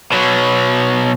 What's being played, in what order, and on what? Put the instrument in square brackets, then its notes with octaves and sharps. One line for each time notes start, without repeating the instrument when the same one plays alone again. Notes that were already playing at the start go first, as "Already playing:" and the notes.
[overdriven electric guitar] B2 F#3